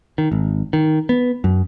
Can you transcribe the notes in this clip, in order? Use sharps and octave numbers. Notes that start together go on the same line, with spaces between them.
D#3
G#1
D#3
B3
F#2